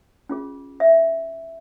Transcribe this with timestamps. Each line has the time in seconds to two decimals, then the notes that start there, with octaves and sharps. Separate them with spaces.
0.29 C#4 F4 G#4
0.80 E5